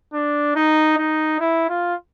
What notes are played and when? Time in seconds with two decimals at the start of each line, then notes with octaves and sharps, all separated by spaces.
0.13 D4
0.56 D#4
0.98 D#4
1.40 E4
1.69 F4